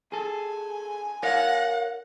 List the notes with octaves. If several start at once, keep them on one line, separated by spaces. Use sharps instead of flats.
G#4 A4 G#5
A#4 C#5 F5 F#5